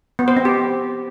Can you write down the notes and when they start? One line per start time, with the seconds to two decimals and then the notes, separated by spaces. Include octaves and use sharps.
0.19 B3
0.28 C5
0.37 C4
0.45 G4